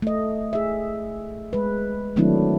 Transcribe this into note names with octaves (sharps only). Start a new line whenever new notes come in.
A3 D#5
G#4 E5
G#3 B4
D#3 F#3 A3 C4 D4 E4